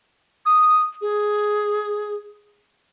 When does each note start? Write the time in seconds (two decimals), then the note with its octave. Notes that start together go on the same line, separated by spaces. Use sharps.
0.46 D#6
1.01 G#4